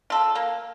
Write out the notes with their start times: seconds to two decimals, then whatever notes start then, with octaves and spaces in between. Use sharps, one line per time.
0.10 F4 A4
0.35 A#3